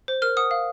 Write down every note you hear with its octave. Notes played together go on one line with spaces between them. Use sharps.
C5
A#4 F6
F#5 D#6
F5